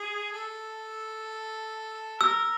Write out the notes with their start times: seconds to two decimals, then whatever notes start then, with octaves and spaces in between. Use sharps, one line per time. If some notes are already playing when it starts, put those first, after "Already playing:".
Already playing: G#4
0.33 A4
2.21 A#4 E6